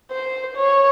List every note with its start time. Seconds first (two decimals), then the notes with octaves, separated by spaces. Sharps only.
0.11 C5
0.56 C#5